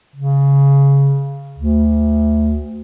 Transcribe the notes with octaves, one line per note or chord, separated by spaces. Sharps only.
C#3
D2